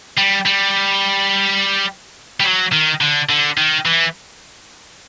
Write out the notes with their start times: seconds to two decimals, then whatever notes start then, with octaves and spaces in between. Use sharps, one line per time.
0.17 G3
0.45 G3
2.40 G3
2.45 F#3
2.72 D#3
3.01 D3
3.29 D3
3.57 D#3
3.85 E3